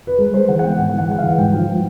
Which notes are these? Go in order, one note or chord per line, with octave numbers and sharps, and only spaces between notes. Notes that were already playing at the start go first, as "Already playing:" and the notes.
B4
G#3 A#4
G#3 C5
E3 F#5
F#5
B3 G5
G#2 F#5
E3 F#5
G#3 F#5
E3 F5
G#2 G5
F3
F3